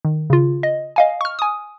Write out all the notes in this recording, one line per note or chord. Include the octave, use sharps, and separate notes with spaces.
D#3
C#3 F4
D#5
D#5 F5 G#5
C#6 F6
G#5 D#6